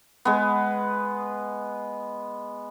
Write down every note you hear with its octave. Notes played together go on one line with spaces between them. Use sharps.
G#3 B3